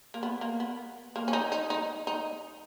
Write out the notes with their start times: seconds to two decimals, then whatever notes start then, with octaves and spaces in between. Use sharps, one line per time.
0.14 A#3
0.23 B3
0.41 A#3
0.60 B3
1.16 A#3
1.28 C#4
1.33 D#4
1.52 D#4
1.70 D#4
2.07 D#4